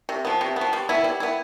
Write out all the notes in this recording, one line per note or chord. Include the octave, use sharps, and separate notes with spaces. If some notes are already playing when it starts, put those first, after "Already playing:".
C3
F3 B3
C3
B3
F3
G3
B3 E4
G3
B3 E4